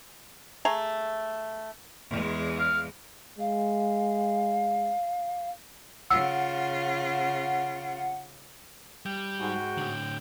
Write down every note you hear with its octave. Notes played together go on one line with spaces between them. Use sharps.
A3 G#4 A#5
E2 G#3
F5
G#3 F5
C#3 F4 F#5 E6
G3 G5
G#2 F#4
A2 D3